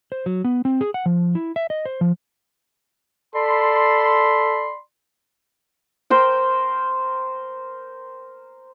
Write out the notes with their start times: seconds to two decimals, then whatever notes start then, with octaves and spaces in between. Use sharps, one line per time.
0.12 C5
0.26 F#3
0.44 B3
0.65 C4
0.81 G#4
0.94 F#5
1.06 F3
1.35 E4
1.56 E5
1.70 D#5
1.85 C5
2.01 F3
3.35 A4 D5 B5 C6
6.10 A#4 C5 G5